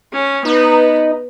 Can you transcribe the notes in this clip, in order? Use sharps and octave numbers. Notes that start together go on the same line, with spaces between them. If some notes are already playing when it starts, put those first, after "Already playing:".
C#4
B3 D#4 B4